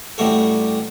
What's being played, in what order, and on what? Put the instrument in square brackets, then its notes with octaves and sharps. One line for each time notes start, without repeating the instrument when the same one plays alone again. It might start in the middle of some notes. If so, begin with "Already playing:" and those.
[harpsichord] A1 G3 A3 F#4 A4